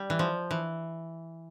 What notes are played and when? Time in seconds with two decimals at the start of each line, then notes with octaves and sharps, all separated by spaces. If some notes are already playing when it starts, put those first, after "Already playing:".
Already playing: G3
0.10 E3
0.19 F3
0.51 E3